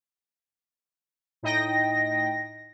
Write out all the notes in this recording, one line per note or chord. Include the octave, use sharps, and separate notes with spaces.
A2 D#4 D#5 G5 A#6